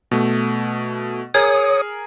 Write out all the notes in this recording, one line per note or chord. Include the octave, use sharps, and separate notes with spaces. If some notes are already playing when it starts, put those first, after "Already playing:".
B2 A3
G#4 A#4 C#5 D#6